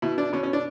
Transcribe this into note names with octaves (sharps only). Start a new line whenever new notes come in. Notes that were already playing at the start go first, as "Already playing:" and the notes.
B2 E4
D4
B2 C#4
C#4
D4